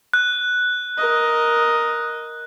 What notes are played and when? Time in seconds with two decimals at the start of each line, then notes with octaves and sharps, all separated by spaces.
0.14 F#6
0.98 A#4 D#5